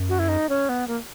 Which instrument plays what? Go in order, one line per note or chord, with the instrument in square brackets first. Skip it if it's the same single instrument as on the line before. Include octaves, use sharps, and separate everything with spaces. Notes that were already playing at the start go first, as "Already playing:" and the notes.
Already playing: [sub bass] F#2
[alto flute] F#4
E4
D#4
C#4
B3
A#3